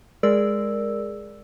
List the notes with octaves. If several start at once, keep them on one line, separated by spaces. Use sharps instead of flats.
G#3 G#4 A#4 D5 E6